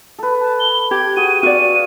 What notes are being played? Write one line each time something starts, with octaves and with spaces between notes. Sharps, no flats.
A4 B4
A5
G7
G4 G#6
F#4 G#4 D#7
F#4 D5 F5